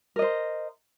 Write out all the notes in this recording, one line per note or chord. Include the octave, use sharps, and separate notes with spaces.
A#4 C5 D#5